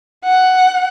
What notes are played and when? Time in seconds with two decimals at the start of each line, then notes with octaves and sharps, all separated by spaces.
0.25 F#5